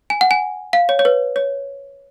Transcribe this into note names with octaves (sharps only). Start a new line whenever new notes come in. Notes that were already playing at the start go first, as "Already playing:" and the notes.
G#5
F#5
G#5
F5
C#5
C#5
B4
C#5